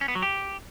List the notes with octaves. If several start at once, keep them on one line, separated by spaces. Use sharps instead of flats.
C#4
B3
F#3
G4